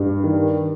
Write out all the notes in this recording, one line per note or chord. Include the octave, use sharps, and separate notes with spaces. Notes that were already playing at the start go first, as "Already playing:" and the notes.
Already playing: G2
D#3